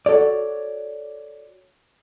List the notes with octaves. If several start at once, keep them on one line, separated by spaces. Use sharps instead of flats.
F#4 A4 C#5 D5